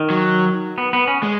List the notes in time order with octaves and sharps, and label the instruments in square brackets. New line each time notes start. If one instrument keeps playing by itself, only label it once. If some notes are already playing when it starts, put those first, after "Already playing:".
Already playing: [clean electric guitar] D#3
[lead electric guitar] F#3
[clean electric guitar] B3
B3
C#4
[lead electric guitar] G#3